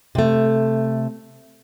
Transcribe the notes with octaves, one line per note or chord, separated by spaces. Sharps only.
C3 A3